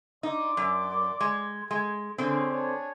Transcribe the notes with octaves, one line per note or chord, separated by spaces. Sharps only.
D#4 D5 C6 D6
F#2
G#3
G#3
D3 C4 C#4 G#4
D4 G#4 C#5